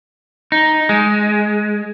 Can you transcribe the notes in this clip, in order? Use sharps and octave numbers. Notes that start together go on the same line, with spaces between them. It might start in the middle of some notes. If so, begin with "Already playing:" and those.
D#4
G#3